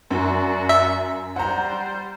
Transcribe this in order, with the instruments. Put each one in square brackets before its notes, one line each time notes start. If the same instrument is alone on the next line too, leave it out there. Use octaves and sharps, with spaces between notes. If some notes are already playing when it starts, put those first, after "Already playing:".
[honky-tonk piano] F#2 [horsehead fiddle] D4 F#4
[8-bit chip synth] E5
[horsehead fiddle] G3 C5 [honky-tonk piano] F#5 A#5